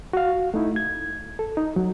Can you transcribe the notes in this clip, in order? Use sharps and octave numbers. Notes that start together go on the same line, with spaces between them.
F#4 F5
A3 D#4 E4
G#6
A4
D#4
F#3